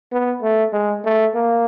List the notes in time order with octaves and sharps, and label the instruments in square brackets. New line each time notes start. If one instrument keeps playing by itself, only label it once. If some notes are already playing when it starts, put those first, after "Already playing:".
[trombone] B3
A3
G#3
A3
A#3